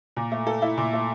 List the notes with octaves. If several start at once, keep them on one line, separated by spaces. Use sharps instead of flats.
A#2
A3
A4
E4
A#2
A3